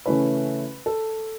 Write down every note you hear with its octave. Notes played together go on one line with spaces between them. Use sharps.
C#3 E3 A3 C#4 E4 B4
A4